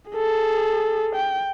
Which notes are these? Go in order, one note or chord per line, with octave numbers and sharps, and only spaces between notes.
G#4 A4
G5